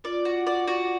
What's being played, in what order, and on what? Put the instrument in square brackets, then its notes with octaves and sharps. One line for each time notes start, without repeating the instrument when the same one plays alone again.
[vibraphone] F4 [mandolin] D5
[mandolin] F#4
D5
F#4